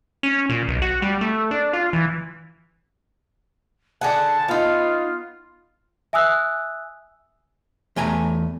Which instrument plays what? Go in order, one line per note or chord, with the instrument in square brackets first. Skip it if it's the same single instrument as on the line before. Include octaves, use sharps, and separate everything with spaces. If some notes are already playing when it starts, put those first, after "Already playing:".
[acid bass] C#4
A#2
B1
F#4
G3
A3
D4
F4
E3
[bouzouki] D3 G#4 F#5 [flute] A5
[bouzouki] B3 D#4 [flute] F4
[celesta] E5 G#5 D#6 E6 F#6
[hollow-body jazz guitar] E2 A3 G#5 A#5